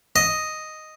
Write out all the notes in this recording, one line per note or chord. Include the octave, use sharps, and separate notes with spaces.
D#5